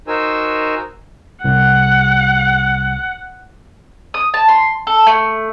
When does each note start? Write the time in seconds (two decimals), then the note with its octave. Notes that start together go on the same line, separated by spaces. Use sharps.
0.08 D#4 F#4 A#4 C5 G#5 E6
1.44 C2 F#5
4.14 D#6
4.34 A5
4.48 C6
4.87 A4
5.07 A3